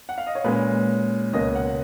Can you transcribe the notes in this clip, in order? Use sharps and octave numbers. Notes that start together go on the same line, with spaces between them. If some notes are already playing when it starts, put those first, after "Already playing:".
F#5
F5
D#5
C#5
A#2 G#3 C#4 B4
C#2 B2 A#3 C#4 D#5
F#5